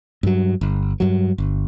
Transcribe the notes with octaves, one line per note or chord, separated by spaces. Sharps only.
G2 F#3
G1
G2 F#3
G1